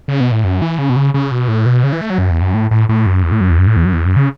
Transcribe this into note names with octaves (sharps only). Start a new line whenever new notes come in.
C#3
B2
A2
F#2
E3
C#3
B2
C#3
C#3
B2
A2
B2
C#3
E3
A3
F#3
F#2
E2
F#2
A2
A2
A2
F#2
E2
A2
F#2
E2
F#2
A2
E2
F#2
E2
F#2
C#3